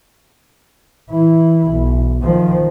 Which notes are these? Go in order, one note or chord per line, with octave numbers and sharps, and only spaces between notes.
E3 E4
B1
D#3 F3